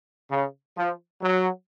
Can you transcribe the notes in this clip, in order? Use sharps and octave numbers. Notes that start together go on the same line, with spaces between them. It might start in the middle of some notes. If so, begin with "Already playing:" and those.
C#3
F3
F#3